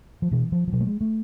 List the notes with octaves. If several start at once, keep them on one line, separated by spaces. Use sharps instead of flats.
F3
B2 E3
F3
F3
B2 F#3
A3
G#3
A3